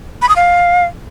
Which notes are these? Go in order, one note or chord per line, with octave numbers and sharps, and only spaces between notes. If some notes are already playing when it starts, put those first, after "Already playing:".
B5
D#6
F5